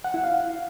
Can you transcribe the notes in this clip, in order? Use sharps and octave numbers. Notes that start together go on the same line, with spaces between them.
F#5
E4
F5